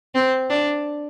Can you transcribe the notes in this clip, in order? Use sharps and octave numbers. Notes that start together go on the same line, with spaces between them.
C4
D4